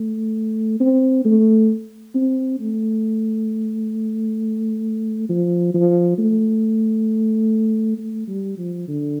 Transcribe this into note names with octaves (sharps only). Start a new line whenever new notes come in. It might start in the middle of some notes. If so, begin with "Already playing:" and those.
Already playing: A3
C4
A3
C4
A3
F3
F3
A3
A3
G3
F3
D3